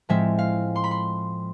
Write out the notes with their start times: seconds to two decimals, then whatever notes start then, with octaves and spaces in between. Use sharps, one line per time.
0.09 A2 F3 G#3 C4 E5
0.39 F5
0.76 C6
0.84 B5
0.91 C6